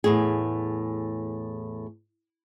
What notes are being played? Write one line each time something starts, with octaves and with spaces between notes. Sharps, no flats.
E2 A2 G#4